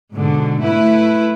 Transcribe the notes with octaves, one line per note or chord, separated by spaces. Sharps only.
G#2 B2 D3
A3 E4 B4